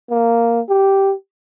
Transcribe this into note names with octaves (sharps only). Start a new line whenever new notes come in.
A#3
G4